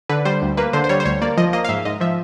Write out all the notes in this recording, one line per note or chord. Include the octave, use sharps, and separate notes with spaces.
D3 B4
G3 C5
D2
A#3 B4
D3 C5
C5
G3 C#5
C5
D2 C#5
A#3 D5
F3 D#5
A#3 D#5
F5
G#2 E5
G#2 D#5
F3 E5